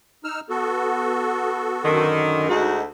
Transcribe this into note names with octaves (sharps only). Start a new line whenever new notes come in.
D#4 E6 F6
B3 F#4 A4
F#2 D3 D#3
D2 G#3 D#4 F#4